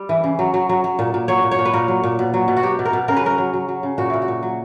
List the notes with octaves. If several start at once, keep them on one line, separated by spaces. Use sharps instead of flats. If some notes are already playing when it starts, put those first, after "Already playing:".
Already playing: G3
E3
C#3
F#3
F#3
F#3
F#3
A#2
A#2
F#3 C#5
A#2
C#5
A#2
B4
A#2 A#4
F#3
A#2
B2
F#3
B2
F#4
F#3 G4
B2
A#4
B2
C#3 A#4
B4
F#3 A#4
F#3
F#3
F#3
C#3
A#2 F#4
A#2 E4
F#4
A#2
F#3